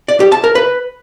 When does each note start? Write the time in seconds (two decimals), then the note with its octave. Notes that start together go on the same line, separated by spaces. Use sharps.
0.08 D5
0.20 G4
0.32 A5
0.44 A#4
0.55 B4